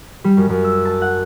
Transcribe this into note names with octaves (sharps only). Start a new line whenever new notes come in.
G3
F#2
F#2
E6
A5
F#5